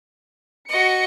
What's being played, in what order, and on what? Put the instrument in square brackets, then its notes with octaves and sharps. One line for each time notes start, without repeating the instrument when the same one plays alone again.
[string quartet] F#4 D#5 [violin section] C#7